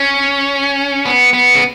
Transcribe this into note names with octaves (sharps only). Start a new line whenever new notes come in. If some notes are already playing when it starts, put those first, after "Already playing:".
Already playing: C#4
B3
B3
C#3